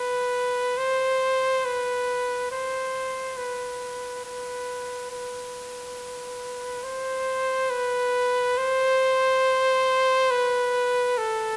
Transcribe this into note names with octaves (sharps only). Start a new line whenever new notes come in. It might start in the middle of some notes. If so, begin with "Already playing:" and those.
Already playing: B4
C5
B4
C5
B4
B4
B4
C5
B4
C5
B4
A4